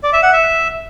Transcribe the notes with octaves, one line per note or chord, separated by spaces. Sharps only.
D5
E5
F#5
E5